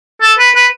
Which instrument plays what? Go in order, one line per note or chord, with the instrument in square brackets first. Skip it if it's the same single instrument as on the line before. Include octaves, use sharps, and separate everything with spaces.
[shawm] A4
B4
B4